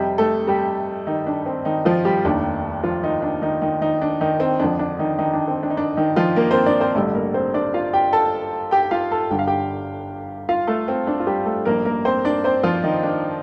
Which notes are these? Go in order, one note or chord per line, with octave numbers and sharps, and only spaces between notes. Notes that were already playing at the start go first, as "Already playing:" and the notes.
Already playing: F2 C3 G3 G4
A3 A4
G3 G4
D#3 D#4
D4
C4
D#3 D#4
F3 F4
G3 G4
F1 D#2 D#3 D4
F3 F4
D#3 D#4
D4
D#3 D#4
D#3 D#4
D#3 D#4
D4
D#3 D#4
C4
F2 D3 F3 D4
D4
D#3 D#4
D#3 D#4
D4
C4
D4
D#4
D4
D#3 D#4
F3 F4
A#3 A#4
C4 C5
D4 D5
C4 C5
A1 G2 D3 G3 A3 A4
A#3 A#4
C4 C5
D4 D5
F4 F5
G4 G5
A4 A5
G4 G5
G5
F4 F5
A4 A5
G1 G2 D3 G3 G5
F5
G4 G5
F4 F5
A3 A4
C4
D4
F4
G3 G4
A3 A4
A1 G2 F3 A#3 A#4
A#3 A#4
C4 C5
D4 D5
C4 C5
F3 F4
D#3 D#4
D4